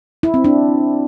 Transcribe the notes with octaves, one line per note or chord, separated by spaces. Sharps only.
E4
C4
D4